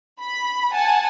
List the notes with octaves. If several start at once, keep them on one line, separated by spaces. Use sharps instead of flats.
B5
F#5 G#5 A5